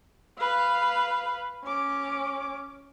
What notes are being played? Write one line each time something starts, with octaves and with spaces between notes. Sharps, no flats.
B4 F5
C#4 D6